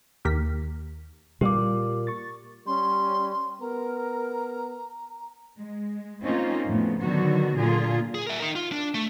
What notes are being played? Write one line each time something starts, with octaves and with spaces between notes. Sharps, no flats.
D#2 G4 A#4 B6
A#2 G3 G4 D6
C#6 A6
G3 C#4 C6
B3 A#4 A#5
G#3
A#3 C4 C#4 D#4 F4
F2 A2 C#3 B3
D3 D#3 F#3 B3 F#4
A#2 D3 F4 G#4
G#4
A#4 E5
D#4 A#4
F4
D4
A3